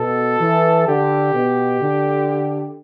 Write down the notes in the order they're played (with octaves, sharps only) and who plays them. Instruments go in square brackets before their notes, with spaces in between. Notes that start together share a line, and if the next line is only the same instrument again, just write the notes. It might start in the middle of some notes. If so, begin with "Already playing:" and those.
Already playing: [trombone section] B2 [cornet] A4
[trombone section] E3
[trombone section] D3 [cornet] G4
[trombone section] B2
D3